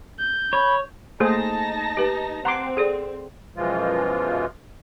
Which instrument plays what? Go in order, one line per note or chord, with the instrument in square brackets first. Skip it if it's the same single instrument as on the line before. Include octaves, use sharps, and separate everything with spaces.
[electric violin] G6
[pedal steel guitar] C#5 [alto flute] B5
[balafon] A3 A#3 A4 [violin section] D#4 A5 A#6 [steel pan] G#4 C5
[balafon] G4 B4
[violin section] C4 [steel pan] F#5 C6 D6 [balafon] A#5
[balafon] G#4 A4 D5
[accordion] F#2 B2 E3 F3 G#3 F4